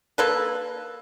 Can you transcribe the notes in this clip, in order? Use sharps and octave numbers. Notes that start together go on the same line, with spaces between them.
A#3 A4 B4